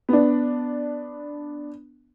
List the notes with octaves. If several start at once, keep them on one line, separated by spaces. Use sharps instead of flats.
B3 D4